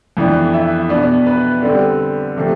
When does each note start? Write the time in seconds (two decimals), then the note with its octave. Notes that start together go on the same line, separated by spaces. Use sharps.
0.17 F2 E3 B3 D4
0.54 E5
0.89 B2 B3 D4 D5
1.26 B4
1.62 D3 G3 C4
2.37 C3 F3 A3